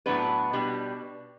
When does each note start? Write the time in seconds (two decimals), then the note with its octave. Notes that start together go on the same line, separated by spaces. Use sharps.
0.06 A2 F#3 B3 D4 B4
0.53 B2 G3 D4